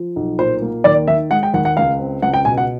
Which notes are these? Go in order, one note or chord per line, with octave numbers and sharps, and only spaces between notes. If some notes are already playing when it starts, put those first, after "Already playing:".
Already playing: F3
B1
A#2 C5
A#3
D#2 D5
D#3 E5
G#3 F#5
G5
D#2 F#5
F#5
C#2 F5
C4
C#2 F#5
G5
B2 G#5
F#5